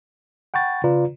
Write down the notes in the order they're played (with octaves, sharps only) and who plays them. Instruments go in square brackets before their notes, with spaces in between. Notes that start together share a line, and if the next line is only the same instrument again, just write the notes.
[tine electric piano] F#5 G5 B5 C#6 A6
C#3 F4 B4 D5 A#5